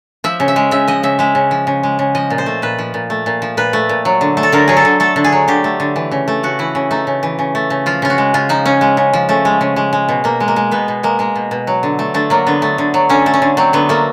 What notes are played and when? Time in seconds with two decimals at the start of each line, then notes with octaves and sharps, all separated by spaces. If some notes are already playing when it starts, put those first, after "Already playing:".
0.24 F3 E5
0.40 C#3
0.48 E5
0.56 G#3
0.71 C#3 E5
0.88 F3 D#5
1.03 C#3 E5
1.19 G#3 E5
1.35 C#3
1.51 F3
1.67 C#3
1.83 G#3
1.99 C#3
2.15 F3 D#5
2.30 A#2
2.38 C5
2.46 A3
2.62 A#2 B4
2.79 F3
2.94 A#2
3.10 A3
3.26 A#2
3.42 F3
3.57 A#2 B4
3.73 A3
3.89 A#2
4.05 F#3
4.21 D3
4.37 A3
4.43 A4
4.52 D3 A#4
4.68 F#3 G#4
4.77 A4
4.85 D3
5.00 A3 A4
5.16 D3
5.24 G#4
5.32 F#3
5.48 D3 G4
5.64 A3
5.80 D3
5.96 E3
6.11 C#3
6.28 A3
6.43 C#3 F#4
6.59 E3 E4
6.75 C#3
6.91 A3 D#4
7.07 C#3
7.23 E3
7.39 C#3
7.55 A3
7.70 C#3
7.86 F3 F4
8.02 C#3 F4
8.10 F#4
8.18 G#3
8.34 C#3 F4
8.49 F3 D#4
8.65 C#3 C#4
8.81 G#3
8.97 C#3
9.13 F3
9.29 C#3 A3
9.45 G#3
9.61 C#3
9.76 G#3
9.93 G#3
10.09 B2
10.24 B2 A#3
10.40 G#3
10.48 A#3
10.56 G#3
10.71 B2 B3
10.88 B2
11.03 G#3 A#3
11.19 G#3 A#3
11.36 B2
11.51 B2
11.67 F#3
11.83 D3
11.99 A3
12.14 D3 A3
12.30 F#3 A#3
12.46 D3 B3
12.62 A3
12.78 D3
12.94 F#3
13.09 D3 C#4
13.26 A3
13.34 C#4
13.42 D3
13.57 F#3 C4
13.73 D3 B3
13.89 A3 A#3